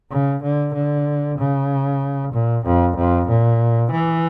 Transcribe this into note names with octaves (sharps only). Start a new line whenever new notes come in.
C#3
D3
D3
C#3
A#2
F2
F2
A#2
E3